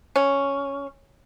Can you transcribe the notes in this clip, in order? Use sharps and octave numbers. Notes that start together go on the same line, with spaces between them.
C#4